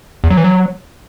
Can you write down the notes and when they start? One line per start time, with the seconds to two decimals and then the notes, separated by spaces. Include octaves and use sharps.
0.24 E2
0.30 F#3
0.37 E3
0.44 F#3